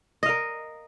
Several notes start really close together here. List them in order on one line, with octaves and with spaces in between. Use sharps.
D#5 F5 A#4